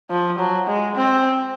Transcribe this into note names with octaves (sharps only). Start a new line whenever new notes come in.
F3
F#3
G#3
C4